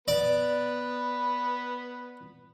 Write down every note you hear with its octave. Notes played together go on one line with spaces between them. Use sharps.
B3 B4 D5